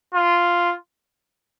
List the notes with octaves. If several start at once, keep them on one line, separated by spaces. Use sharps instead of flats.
F4